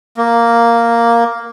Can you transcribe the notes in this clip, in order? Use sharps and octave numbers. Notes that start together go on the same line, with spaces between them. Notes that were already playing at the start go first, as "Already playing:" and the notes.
A#3